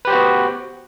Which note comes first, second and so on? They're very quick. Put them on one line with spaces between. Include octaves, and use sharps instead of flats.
B4 G4 C5 F#4 B3